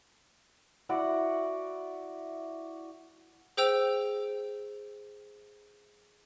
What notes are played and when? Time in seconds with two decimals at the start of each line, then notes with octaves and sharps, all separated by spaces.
0.89 E4 F#4 D5 F#5
3.57 G#4 C5 G5 E6 F7